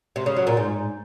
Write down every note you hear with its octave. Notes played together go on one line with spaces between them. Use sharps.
C3
C#3
F#3
A#2
G#2